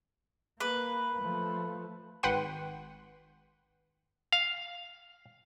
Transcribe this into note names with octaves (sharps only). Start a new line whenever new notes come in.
A#3 B4
F3 A3
G#1 B4 F#5 G5 C6 D#7
F5